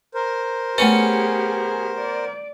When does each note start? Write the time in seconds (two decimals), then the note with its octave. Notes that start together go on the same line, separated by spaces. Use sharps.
0.14 A#4 C5
0.78 A3 B3 C#4 G4 G#4 B4
1.98 D5